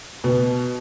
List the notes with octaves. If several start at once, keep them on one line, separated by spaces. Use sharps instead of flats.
B2